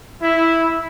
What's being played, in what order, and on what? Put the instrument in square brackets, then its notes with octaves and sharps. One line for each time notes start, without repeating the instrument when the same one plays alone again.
[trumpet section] E4